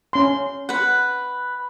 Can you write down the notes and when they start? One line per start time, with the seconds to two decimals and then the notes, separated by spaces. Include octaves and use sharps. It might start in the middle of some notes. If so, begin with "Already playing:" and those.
0.13 C#4 C6
0.69 B4 F#5